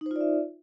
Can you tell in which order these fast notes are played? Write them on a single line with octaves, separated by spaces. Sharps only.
D#4 C5 F4 D5 E5